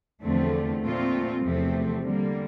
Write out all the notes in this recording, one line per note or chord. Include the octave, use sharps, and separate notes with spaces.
E2 D3 F3 A3 C4
A#2 A3 C4 F4
E2 C3 F3 A3 C4
D3 G3 A#3